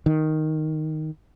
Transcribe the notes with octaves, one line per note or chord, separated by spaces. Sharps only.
D#3